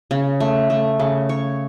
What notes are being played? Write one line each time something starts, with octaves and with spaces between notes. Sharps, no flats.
C#3
A3
A3
C#3
C#5